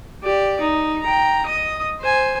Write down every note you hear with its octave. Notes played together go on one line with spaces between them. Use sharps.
G4 D5
D#4
G5 A#5
D#5 D#6
C5 G#5